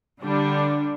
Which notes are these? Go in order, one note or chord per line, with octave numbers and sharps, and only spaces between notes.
D3 G3 D4